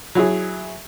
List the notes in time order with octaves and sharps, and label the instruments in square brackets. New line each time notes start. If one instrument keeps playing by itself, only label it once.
[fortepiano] F#3 E4 G#4